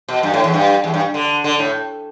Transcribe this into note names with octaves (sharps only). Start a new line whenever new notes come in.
B2
G2
A2
E2
G2
E2
G2
D3
D3
A2